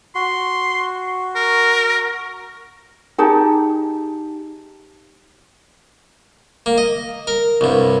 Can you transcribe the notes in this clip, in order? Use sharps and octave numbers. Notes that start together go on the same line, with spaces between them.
F#4 C6
A#4
D#4 G4 G#4 A5
A#3
D#5
A#4
C2 G2